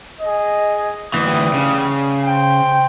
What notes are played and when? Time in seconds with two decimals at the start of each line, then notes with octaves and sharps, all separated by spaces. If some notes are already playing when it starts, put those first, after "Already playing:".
0.21 G#4 D#5
1.14 D2 E3 G3 D#6
1.54 C#3
2.23 C5 G5